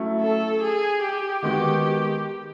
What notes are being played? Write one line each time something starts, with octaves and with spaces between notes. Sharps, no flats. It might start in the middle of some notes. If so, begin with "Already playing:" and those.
Already playing: F#3 A3 C#4 E4
A4
G#4
G4
D#3 G#3 B3 D#4 F#4 G4